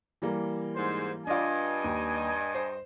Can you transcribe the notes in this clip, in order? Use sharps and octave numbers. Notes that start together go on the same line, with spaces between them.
E3 G3 A#3
G#2 C5
G2 D4 F4 D#5 G#5
D#2
C5